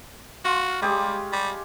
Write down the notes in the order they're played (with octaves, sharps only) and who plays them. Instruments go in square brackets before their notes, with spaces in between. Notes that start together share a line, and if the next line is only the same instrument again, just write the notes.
[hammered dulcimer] F4 [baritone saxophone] F#4
[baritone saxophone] G3 [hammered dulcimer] G#3 G4 C#5
[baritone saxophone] G3